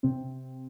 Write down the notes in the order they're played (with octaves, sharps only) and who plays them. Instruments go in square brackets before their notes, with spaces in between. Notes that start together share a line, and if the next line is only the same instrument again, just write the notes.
[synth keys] C3 C4